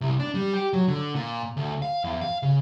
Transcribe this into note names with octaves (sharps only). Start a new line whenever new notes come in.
C2
D4
G3
G4
F#3
D3
A#2
D2
F5
E2
F5
C#3